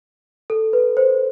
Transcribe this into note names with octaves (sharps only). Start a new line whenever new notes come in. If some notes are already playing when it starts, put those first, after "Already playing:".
A4
B4
C5